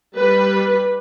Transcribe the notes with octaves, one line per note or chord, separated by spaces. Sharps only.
G3 B4